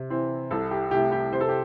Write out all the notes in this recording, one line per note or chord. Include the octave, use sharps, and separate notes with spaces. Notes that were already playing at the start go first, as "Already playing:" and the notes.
Already playing: C3
E3 C4 E4
C2 A4
G4
C3 A3 E4 G4
G4
C3 C5
A4
G4